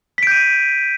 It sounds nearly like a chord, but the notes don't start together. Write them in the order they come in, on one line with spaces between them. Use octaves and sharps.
B6 D7 G6 D#7